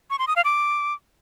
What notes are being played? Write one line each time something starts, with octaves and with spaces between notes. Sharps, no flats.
C#6
C6
D#6
F5
D6